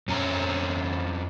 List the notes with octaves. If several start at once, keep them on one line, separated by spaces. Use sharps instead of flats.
F2 C#4 A#5